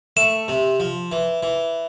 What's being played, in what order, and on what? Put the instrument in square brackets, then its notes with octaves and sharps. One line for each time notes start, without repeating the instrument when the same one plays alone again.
[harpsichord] A3 [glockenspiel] E7
[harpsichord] C3
F3
E3
E3